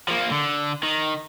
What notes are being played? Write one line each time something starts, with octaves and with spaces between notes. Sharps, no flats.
F3 A#3
D3
D#3